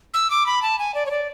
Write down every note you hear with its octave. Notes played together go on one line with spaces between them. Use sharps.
E6
D6
B5
A5
G#5
D5
C#5
D5